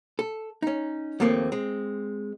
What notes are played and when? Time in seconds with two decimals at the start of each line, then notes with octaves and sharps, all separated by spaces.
0.19 A4
0.62 C#4 D#4
1.20 D#2 F3 A3 A#3 C4
1.52 G#3 C4